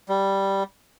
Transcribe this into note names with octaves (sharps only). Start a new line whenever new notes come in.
G3